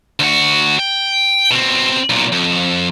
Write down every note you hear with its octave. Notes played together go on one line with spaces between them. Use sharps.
D2 F#4
G5
B2 C4
B1 A#2
F2